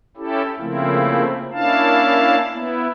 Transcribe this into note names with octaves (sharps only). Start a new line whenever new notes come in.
C#4 E4 G4 A4
C#3 F3 A3 A#3 C4 E4
A#3 C#4 D4 E4 F5 A5
B3 E4